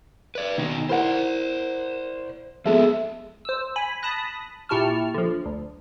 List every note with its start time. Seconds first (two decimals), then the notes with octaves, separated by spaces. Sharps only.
0.35 B4 D5
0.58 B2 D#3 D#4
0.89 E4 A#4 C5 D5 F#5
2.65 F3 G#3 B3 A4 E5
3.45 C5 E6
3.76 G#5 B5
4.02 A5 B5 D#6 F#6 A#6
4.69 A#2 E4 G4 A5 C#6 F6
5.14 D3 F3
5.46 D2